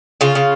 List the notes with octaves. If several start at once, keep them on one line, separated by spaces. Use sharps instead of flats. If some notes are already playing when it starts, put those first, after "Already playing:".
C#3 F4
C#3